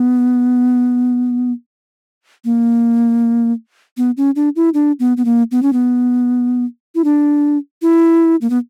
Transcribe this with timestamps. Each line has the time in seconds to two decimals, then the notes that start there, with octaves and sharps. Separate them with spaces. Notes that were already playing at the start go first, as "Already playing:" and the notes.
Already playing: B3
2.45 A#3
3.97 B3
4.17 C#4
4.36 D4
4.56 E4
4.74 D4
5.00 B3
5.17 B3
5.25 A#3
5.52 B3
5.63 C#4
5.73 B3
6.95 E4
7.04 D4
7.82 E4
8.41 A#3
8.50 B3